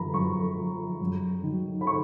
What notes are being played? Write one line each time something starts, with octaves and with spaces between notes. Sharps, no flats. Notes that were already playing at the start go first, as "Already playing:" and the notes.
Already playing: F#2 F3 A#5 B5
F#2 C#6
F3
F#2
D#3 F#3
B5
C#6